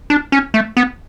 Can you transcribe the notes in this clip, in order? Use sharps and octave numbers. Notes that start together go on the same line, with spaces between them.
D4
C#4
A3
B3